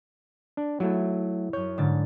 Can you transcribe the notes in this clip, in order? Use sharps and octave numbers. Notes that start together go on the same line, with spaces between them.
D4
F#3 A3 E4
F#2 C#5 G6
G#2 D3 A6